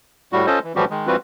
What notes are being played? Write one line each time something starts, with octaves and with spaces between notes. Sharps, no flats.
A2 G3 F#4
C#4 F4 A4 C5 D#5
E3
A2 E3 F3 G3 F#4 G4
D#3 G#3
E3 G3 C4 F4 F#4 B4